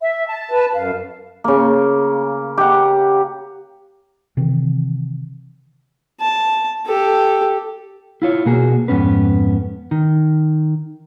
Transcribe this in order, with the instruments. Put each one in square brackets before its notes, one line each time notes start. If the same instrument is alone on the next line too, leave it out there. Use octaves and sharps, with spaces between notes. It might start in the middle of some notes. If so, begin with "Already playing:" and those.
[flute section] E5
A5
[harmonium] B4
[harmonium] F#2 [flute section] F5
[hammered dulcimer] C#3 A#3
G4 F#5
[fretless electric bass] C3 D#3 E3 C4
[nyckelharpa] A5
G4 A4
[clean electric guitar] E4 F4 C#5
B2 A#3 F#4 G#4
F2 G#2 B3 C#4 B4
D#3